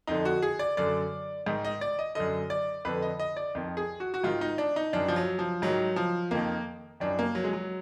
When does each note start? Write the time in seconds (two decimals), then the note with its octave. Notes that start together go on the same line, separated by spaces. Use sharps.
0.07 F2 D3 D#4
0.25 F#4
0.43 G#4
0.59 D5
0.77 F#2 D3 D5
1.46 G#2 D#3
1.65 D#5
1.81 D5
1.99 D#5
2.15 F#2 D3 D#5
2.50 D5
2.85 F2 D3 B4
3.02 D#5
3.19 D#5
3.37 D5
3.55 F2 D#3
3.77 G#4
4.00 F#4
4.14 F#4
4.24 G#2 D#3 F4
4.41 D#4
4.58 D4
4.76 D#4
4.93 F#2 D#3 D4
5.08 F3
5.16 F#3
5.39 F3
5.62 G#2 D#3 F#3
5.96 F3
6.31 F2 D#3 A#3
7.00 F#2 D#3 D4
7.19 A#3
7.35 F#3
7.44 G#3
7.53 F#3